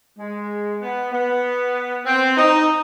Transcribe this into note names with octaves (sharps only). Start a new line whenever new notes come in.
G#3
B3
B3
C4
D#4